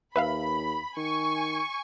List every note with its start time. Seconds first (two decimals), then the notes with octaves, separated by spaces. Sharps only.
0.16 D#2 B4 E5 F5 B5
0.97 D#3 G#5 C#6